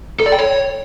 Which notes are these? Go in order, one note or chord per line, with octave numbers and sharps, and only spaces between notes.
A4
D5
G5
C#5